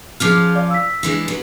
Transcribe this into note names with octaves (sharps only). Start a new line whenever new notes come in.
F3 C#4 F4 G#4 D6 F6
D5 F5 D6
E6 B6
E3 G#3 D4
F#3 B3